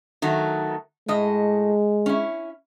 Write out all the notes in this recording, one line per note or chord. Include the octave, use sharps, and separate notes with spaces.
D#3 F#3 A3
A2 G#3 D#5
C#4 E4